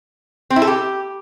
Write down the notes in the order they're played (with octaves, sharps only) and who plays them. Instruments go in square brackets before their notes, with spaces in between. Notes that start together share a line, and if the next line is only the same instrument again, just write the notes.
[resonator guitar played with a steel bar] C4
E4
A4
G4